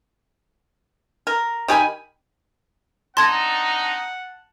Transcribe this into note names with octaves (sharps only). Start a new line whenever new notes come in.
A#4
D#3 G4 G#5 B5
C4 D4 D#4 F#5 A5 C6 G#6